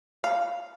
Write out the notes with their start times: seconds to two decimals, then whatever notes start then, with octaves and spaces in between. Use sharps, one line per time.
0.24 F5